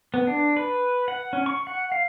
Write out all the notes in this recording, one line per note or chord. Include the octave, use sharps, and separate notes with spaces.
B3
D4
B4
F#5
C#4
C#6
F#5
F5